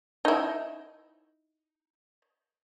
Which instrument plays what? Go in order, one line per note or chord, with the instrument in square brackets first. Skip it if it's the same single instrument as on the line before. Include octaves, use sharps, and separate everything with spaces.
[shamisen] D#4 E4